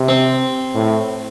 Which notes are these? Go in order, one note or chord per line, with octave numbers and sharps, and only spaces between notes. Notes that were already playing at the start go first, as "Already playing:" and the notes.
Already playing: C3
C4
A2